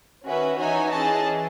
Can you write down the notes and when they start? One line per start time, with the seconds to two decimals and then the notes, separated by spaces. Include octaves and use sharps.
0.24 D#3 C#4 F#4 B4 E5
0.57 E3 D#4 F#4 C#5 E5 G#5
0.91 E3 C#4 G#4 D#5 A5